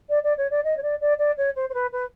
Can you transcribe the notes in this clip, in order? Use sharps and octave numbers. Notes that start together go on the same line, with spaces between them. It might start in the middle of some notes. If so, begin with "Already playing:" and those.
D5
D5
C#5
D5
D#5
C#5
D5
D5
D5
C#5
C5
C5
B4
B4